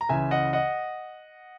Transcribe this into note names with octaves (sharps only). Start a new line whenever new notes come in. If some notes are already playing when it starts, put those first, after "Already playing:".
A#5
C#2 C#3 E3 E5 G#5
D#5 F#5
D#5 F#5